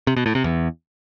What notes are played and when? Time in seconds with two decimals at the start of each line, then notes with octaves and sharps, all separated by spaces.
0.07 C3
0.16 B2
0.26 A2
0.35 C3
0.44 E2